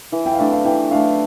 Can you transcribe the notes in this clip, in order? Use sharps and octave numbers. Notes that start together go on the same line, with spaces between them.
E3
G5
F5
A3 D4 E5
F5
E3 G5
A3 D4 F5